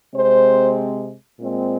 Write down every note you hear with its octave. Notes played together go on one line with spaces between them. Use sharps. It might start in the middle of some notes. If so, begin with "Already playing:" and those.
C3 G#3 C4 C5
A#2 G#3 C4